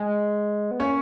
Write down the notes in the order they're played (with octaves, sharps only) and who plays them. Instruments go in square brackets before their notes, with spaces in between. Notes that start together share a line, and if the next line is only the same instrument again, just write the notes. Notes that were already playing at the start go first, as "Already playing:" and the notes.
Already playing: [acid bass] G#3
B3
[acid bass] A#3 [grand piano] C#4 C#5